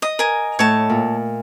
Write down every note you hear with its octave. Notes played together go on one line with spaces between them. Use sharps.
D#5 D#6
A#4 G#5
A2 C#5 A5
A#2